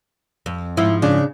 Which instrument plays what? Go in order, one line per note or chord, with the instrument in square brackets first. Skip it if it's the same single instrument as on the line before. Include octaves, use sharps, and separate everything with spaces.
[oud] F2
[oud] G#2 F3 [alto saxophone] E4
[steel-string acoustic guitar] C#3 [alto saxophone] D4